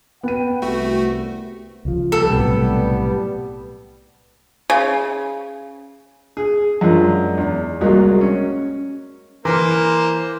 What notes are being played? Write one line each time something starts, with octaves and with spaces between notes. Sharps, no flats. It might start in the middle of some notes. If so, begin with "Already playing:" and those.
B3 F#5 G5 D#7
C2 A3 F#4
C#2 F3
G3 B3 G4 A4
B1 A2 C3
C#3
G#4
F#2 G#3 D4 F4 A#4
E2
C2 F#3 G#3 A#3
C#4
E3 A#3 C5 A#5 C6 D6